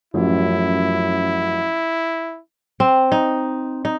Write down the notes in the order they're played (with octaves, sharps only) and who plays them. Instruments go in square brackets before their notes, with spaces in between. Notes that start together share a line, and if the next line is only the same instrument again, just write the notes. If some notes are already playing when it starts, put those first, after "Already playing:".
[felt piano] A1 F3 G4 [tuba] F#2 [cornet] E4
[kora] C4
D#4
D#4